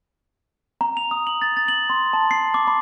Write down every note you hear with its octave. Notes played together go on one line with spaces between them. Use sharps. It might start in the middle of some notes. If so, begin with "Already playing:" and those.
A#5
F7
D#6
F#7
A6
A6
F#7
C6
A5
C7
D6
B5